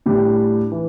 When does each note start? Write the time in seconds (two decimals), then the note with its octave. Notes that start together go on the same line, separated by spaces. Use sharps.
0.06 A2 G3 D4
0.72 E3